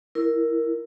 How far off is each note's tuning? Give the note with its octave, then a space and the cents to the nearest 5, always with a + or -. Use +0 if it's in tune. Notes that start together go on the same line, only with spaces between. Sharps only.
E4 +5 A#4 +0